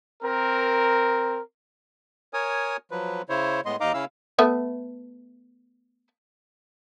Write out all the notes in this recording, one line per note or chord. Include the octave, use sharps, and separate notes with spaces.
C4 A#4
A#4 C#5 G#5 D#6
F3 F#3 B4
C#3 E4 C5 C#5
A2 G#3 B3 D#5 C6
D#2 D#4 D#5 F5 A#5 D6
C#3 C#4 E4 F5 E6
A3 B3 E5